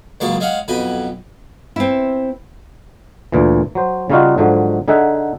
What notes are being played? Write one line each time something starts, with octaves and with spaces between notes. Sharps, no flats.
C#2 F#2 G#3 A#3 A5 C#6
G#3 C#4 F5 F#5
B1 F2 F#4 B4 G5 G#5
C4 E4
D2 A#2 E3
F#3 C5
C#3 G3 C#4 D#4 F4 F#4
G#2 D3 F3 F#3
D3 D#4 G#4 E5 F#5